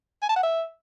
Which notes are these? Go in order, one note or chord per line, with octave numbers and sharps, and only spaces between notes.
G#5
A5
F#5
E5